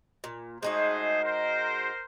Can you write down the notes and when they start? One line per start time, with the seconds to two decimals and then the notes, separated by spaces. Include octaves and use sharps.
0.24 A#2
0.63 G#3 A3 D#4 F#4 G#4 C5
1.23 A#4 C5